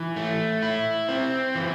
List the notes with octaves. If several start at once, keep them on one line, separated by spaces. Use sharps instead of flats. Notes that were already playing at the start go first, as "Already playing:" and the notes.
Already playing: E3
A3
E4
C4
E3